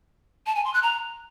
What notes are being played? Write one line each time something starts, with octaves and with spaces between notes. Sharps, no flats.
A5
G#5
C6
F#6
A#5